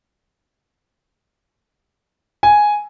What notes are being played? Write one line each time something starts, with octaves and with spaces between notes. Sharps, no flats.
G#5